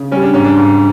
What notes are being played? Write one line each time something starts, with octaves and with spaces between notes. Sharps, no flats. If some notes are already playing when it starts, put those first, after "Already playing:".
Already playing: C#3
G3 C#4
D4
G#2 C#4
D4
G#2